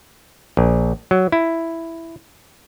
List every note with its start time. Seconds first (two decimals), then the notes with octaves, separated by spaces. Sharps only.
0.57 A#1
1.11 F#3
1.32 E4